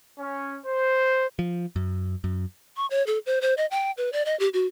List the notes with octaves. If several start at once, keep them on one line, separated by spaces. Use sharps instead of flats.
C#4
C5
F3
F#2
F#2
C#6
C#5
A4
C5
C5
D#5
G5
B4
D5
D#5
G4
F#4